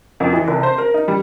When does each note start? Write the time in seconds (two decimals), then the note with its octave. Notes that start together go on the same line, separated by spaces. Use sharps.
0.20 F2
0.33 E3
0.48 F1
0.63 C5
0.78 A#4
0.94 D#4
1.08 G3